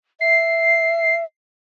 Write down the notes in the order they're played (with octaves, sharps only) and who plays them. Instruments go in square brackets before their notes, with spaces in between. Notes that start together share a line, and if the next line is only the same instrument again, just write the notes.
[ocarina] E5 [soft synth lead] C7